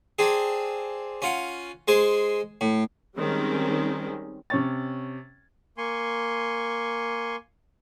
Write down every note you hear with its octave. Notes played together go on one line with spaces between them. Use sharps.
C4 D4 G#4
C#4 F4 F#5
G#3 G#4 C5
A2
D#3 G3 G#3 C4 C#4
C3 C#4 C#5 C#6 A6
A#3 G#5 C6 C#6